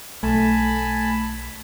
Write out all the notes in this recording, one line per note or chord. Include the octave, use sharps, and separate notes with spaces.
B1 A3 G#5 A5 B5